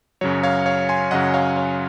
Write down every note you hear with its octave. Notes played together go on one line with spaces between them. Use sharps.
F#2 C#3 F#3 C#5
C#5 F5
C#5 F5
G#5 C6
F#2 C#3 F#3 D#5 F#5
C#5 F5
C#5